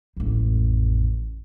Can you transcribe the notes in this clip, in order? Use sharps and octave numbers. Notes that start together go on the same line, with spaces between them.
A1 F2